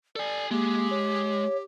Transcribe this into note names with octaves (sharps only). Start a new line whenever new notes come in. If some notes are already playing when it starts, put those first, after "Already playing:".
A4 D5 G#5
G#3 A#3 G4
C#5